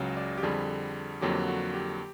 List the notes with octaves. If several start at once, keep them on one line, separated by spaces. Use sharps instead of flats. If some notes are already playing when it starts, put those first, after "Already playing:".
Already playing: C#2 C#3 F#3
D5
G4
F2 D3 G3 G#4
F2 D3 F#3 A#3 G4
F#4
G4